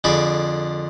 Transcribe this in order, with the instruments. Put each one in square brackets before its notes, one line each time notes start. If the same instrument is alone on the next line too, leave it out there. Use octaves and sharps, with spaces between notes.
[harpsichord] F2 D3 G#4 B5 D6